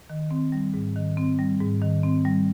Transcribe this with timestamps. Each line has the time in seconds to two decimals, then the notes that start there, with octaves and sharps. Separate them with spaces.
0.10 D#3
0.31 C4
0.52 G3
0.74 G#2
0.96 D#3
1.17 C4
1.39 G3
1.60 G#2
1.82 D#3
2.03 C4
2.25 G3